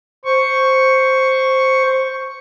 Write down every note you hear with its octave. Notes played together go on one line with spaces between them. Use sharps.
C5 C#6